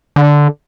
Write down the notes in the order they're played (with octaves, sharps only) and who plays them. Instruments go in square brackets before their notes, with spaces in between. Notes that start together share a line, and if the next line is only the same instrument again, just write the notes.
[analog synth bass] D3